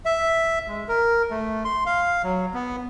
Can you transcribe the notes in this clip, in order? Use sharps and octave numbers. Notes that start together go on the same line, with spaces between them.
E5
G#3
A#4
A3
C6
F5
F#3
B3